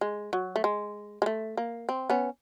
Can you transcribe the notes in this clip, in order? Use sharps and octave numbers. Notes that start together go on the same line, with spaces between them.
G#3
F#3
A3
G#3
G#3
A3
A#3
C4
B3 C#4